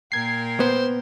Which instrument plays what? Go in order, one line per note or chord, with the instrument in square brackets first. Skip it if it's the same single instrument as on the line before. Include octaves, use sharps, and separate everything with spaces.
[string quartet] A#2 A#4 G5 [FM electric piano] G#6 C7
[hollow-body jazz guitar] B3 [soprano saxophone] C5